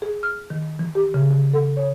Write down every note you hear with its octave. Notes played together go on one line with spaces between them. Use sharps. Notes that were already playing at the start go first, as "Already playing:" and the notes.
G#4
F6
D#3
E3
G4
C#3
D3
A4
C#5